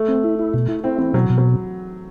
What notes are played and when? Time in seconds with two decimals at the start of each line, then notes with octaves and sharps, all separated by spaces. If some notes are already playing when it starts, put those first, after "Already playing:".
Already playing: A3
0.08 C4
0.24 E4
0.39 E4
0.54 B2
0.68 E4
0.84 C4 E4
0.99 E3 C4
1.14 B2 F#3
1.30 B2
1.38 F#3